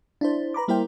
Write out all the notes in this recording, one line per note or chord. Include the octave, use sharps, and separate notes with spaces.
D4 E4 C5
B4 A#5 B5 D6
G3 A#3 E4 A#4 C5 G5